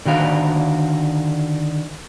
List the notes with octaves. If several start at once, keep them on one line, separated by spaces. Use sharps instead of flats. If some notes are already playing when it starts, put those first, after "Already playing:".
D3 D#3 F#4 F5